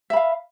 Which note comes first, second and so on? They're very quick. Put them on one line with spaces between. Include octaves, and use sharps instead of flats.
E5 B5 F5